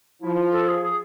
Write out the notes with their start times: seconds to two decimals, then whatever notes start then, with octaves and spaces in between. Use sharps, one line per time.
0.22 F3 E4
0.53 A4
0.68 G#4
0.83 G#4